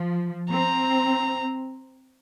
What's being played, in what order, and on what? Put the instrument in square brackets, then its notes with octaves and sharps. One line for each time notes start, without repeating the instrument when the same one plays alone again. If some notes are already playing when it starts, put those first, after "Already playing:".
Already playing: [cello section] F3
[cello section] C4 [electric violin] A#5